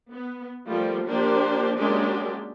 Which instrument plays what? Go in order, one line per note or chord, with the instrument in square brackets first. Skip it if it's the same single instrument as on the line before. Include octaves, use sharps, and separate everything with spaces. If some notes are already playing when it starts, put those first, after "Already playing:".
[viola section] B3
F3 G3 A3 A#3 F4
F3 A#3 D4 G4 C5
F#3 G#3 A#3 C#4 D4 G4